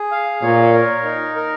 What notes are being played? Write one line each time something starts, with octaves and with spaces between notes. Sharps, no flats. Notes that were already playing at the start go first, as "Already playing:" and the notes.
Already playing: G#4
F5
A#2 C#5
A#4
D#4
A#4